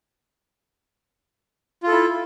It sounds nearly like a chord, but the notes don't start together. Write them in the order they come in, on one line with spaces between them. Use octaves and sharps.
F4 A4 E4